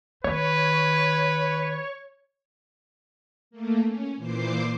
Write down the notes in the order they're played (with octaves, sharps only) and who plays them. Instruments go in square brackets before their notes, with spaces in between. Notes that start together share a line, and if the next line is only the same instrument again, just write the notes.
[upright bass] D#3 [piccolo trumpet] B4 [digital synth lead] C#5
[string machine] A3 A#3
C#4
A#2 E3 C5 D6 C7